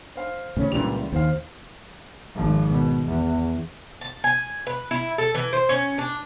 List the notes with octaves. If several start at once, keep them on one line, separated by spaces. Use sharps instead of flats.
C5 F5
A2 C#3 C#4
C#2 A#2 E3 G3 F7
D#2 C5 F5
G#1 F3
B2
E2
A5
G#5
B4
E4
A4
E3
C5
C#4
D4